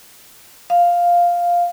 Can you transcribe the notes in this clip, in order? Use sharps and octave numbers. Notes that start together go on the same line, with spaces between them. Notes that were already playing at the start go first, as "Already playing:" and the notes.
F5